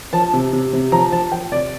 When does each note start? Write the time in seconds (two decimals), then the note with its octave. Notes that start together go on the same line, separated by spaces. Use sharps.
0.13 F3 A5
0.33 C3
0.53 C3
0.73 C3
0.92 F3 A#5
1.12 F3 A5
1.32 F3 G5
1.52 C3 D5